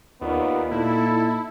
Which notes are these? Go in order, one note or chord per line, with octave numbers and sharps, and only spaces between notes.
D#2 B3 D#4 F4 D5
A#2 E4 A4